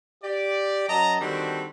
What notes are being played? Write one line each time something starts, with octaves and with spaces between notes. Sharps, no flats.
G4 D5
F#2 F#3 D#5 A5 A#5
D3 D#3 G3 C4 D4 F#4